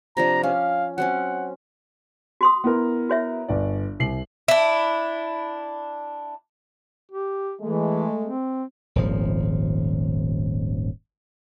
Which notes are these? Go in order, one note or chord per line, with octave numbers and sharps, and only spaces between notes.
C3 F3 D4 A#5
C#4 F5
F#3 C4 C#4 F#5
F#4 C6 D#6
B3 E4 A#4
F#4 C#5 E5
G1 D5
C2 C7 F#7
D4 E4
G4
E3 G#3 A3
C4
D#1 G#1 F3